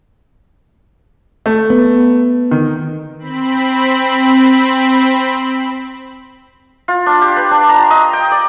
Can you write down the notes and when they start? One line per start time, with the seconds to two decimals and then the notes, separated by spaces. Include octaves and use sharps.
1.46 A3
1.70 B3
2.51 D#3
3.19 C4 B5
6.88 F4
7.06 D4
7.21 G4
7.36 B4
7.51 D4
7.69 A#5
7.90 D#5
8.13 G5
8.31 D5